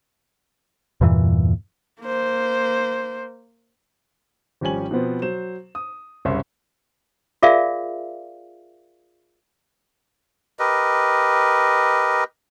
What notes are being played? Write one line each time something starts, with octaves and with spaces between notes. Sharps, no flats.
E2 G2 A#2 E3
A#3 C5
G#1 F3 G3 C#4 G#5 F#7
B2 F3 B3 C4
F#3 C5 E7
D#6
F#1 C2 C#4 E5 C6
F4 G#4 A#4 D5 E5 F5
G4 A#4 B4 D#5